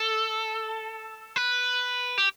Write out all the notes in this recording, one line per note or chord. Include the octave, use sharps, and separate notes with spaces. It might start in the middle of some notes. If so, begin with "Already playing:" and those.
Already playing: A4
B4
G4